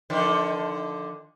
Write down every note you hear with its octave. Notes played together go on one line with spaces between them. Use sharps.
D3 D#3 F3